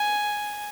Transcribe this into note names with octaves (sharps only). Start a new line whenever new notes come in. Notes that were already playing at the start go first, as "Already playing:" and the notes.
Already playing: G#5